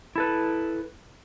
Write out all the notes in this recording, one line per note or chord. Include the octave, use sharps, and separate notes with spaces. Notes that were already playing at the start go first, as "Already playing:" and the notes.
E4 A4 B4